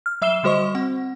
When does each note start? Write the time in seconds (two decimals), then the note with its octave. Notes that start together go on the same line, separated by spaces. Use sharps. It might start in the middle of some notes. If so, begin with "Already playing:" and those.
0.06 F6
0.22 F#3 E5 E6 C7 E7 G7
0.43 D3 G3 F#4 C5 D#5 C#6
0.75 C4 F#5